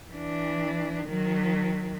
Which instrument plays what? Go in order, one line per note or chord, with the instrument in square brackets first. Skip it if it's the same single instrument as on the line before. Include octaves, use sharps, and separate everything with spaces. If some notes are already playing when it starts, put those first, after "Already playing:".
[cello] E3 D4
D#3 F#3